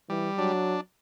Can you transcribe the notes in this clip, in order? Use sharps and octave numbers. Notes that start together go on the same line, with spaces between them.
E3 G3
F#3 D4